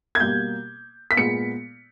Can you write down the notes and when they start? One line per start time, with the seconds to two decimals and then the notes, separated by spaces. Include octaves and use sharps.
0.15 G#6
0.20 B2 G3 A#3 G6
1.11 B6
1.17 A#2 G#3 B3 C#7